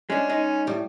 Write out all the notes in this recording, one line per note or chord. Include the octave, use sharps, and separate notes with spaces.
G#3 C#4 D4
G#3 D#4
A2 G3